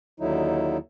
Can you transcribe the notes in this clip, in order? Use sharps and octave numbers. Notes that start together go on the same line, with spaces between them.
D#2 D3 F#3 D#4 E4